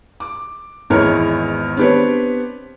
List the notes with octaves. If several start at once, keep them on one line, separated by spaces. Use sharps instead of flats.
D6
G#1 E2 G#3 E4 A#4 C#5
B3 C4 D4 G4 B4 C#5